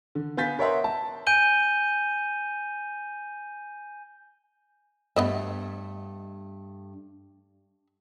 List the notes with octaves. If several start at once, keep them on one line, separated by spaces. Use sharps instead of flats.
D3
B3 F5 G#5 G6 A6 B6
A#4 C#5 D#5 E5 F#5 C6
A5
G#5 G6 D#7 G7
G2 A3 B3 D#5 E5